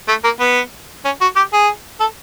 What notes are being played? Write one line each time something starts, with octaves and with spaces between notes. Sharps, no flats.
A3
A#3
B3
C#4
F#4
G4
G#4
A4